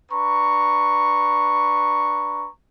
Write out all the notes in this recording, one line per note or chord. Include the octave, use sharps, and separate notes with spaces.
D4 B4 A#5 C#6